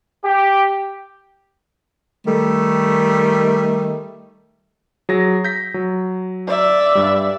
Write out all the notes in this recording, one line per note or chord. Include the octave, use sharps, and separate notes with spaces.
G4
D#3 G3 A3
F#3 G#4 A#6
G6 A#6 B6
F#3
D5 E5
G2 G3